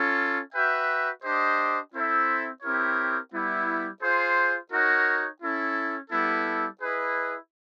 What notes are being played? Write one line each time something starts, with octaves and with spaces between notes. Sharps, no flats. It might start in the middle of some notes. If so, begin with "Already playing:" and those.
Already playing: C#4 F4 A4
F#4 B4 E5 G5
D4 G4 C5 D#5
C4 E4 A4 C5 E5
C4 E4 G4 A#4 C#5
G3 B3 E4
F4 G#4 C5
D#4 F#4 A#4 C#5 F#5
C#4 E4 A4
G3 B3 E4 A4
E4 G#4 B4 D#5